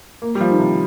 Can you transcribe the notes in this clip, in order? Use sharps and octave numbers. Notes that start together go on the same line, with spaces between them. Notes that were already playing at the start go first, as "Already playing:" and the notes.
A#3
G3
F3
D#3
C3